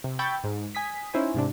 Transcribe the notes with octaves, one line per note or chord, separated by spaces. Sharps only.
C3
G5 B5 C#6 E6 G6 A6
G#2
G#5 D#6 B6
C#4 D#4 E4 C5 G#5
G#2 C3 D4